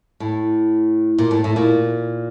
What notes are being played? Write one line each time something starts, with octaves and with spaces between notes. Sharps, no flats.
A2
A#2
A2
A2
A#2